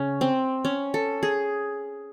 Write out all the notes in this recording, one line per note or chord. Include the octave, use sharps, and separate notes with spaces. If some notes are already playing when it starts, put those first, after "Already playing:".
Already playing: C#3 C#4
C4
C#4
A4
G#4